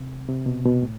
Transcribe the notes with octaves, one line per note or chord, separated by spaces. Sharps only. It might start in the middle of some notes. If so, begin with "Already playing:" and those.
Already playing: C3
C3
B2
B2
A2